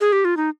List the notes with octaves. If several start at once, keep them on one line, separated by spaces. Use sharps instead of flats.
G#4
G4
F4
D#4